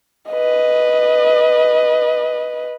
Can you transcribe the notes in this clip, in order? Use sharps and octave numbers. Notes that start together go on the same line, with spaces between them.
B4 D#5